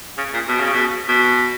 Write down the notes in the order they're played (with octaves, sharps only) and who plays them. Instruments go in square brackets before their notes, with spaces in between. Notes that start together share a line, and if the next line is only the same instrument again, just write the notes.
[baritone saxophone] C#3
A#2
B2
C#3
B2
B2